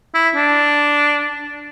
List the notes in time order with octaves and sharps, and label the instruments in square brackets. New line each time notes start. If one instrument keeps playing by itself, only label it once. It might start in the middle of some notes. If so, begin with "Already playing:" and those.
[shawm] E4
D4